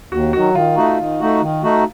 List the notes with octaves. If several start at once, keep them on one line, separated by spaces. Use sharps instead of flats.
D#2 F#4
D#3 F#3 F#4
D#3 F4
A3 D#4 F#4
D#3
A3 D#4 F#4
D#3
A3 D#4 F#4